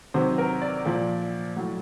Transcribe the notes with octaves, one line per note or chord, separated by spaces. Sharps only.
C3 D#3 F#3 C5
A#4
D5
A#2 F3
A2 F#3